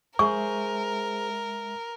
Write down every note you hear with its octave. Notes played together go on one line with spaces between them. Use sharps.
G#3 G#4 A#4 C5 E5 C#6